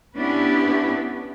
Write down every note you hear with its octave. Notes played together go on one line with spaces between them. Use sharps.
B3 C#4 D4 E4 G4 B4